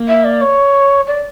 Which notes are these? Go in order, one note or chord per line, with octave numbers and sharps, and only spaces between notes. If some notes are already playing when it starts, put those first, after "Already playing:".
Already playing: A#3
E5
D5
C#5
D5